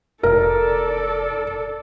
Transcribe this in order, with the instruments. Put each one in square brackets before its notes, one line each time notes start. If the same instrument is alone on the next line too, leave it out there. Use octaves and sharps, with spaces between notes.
[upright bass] F1 [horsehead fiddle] A4 D5 [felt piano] A#4